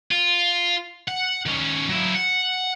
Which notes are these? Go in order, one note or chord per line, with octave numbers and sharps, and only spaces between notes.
F4
F#5
D#3 C#4
F#3 E4
F#5